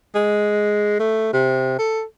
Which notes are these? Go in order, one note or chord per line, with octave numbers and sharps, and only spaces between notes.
G#3
A3
C3
A4